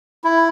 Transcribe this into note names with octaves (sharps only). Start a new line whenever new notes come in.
E4